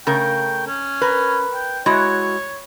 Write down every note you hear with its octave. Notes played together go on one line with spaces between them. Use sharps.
C#3 A3 A#4 G5
C#4
A#4 B4
G5
G#3 E4 F#4 C#5